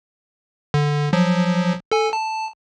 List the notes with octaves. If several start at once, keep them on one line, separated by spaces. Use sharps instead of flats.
D3
F3 F#3
A4 G#5
A5